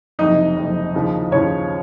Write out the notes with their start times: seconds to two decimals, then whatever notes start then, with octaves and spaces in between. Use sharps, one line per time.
0.19 F#1 F2 C3 D#4 D#5
0.56 F#1 F2 C3
0.94 D#2 C#3 F3
1.31 D#2 C#3 F3 C#4 C#5